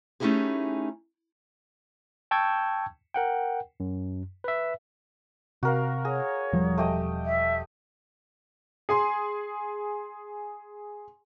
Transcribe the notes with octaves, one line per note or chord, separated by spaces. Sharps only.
A3 C#4 D#4 E4 G4 G#4
G5 A5 C#6 E6 G6 G#6
A#4 F#5 G5
F#2
B4 E5
C3 F#4 A#4 F5
G#4 C#5
E1 F3 G3
A3 G4 D#5
E5
G#4 G#5 C6